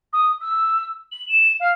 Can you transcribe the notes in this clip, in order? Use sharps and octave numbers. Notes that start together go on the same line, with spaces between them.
D#6
E6
F#7
E7
F5